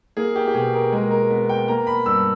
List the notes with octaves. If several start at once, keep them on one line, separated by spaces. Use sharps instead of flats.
A#3 G#4
G4
G4
B2 G#4
A#4
G#3 A#4
A#4
B3
G5
A#3 A#5
B5
G2 E6